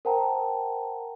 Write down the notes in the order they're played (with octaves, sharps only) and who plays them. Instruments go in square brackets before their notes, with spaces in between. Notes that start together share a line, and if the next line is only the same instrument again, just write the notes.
[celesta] A#4 C5 F#5 G5 A5 A#5